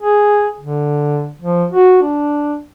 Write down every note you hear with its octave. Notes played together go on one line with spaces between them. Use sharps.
G#4
D3
F3
F#4
D4